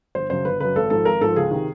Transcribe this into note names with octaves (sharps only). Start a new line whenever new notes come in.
G1 C5
F#2 C#3 C5
G1 B4
F#2 C#3 B4
G#1 A4
G#2 F3 A4
G#1 A#4
G#2 F3 A4
C#2 G#4
C3 D#3